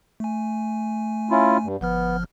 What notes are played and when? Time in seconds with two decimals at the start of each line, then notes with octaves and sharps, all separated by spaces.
0.20 A3 G#5
1.31 C#4 E4 F4
1.64 G2
1.81 G1 F3 B3 F6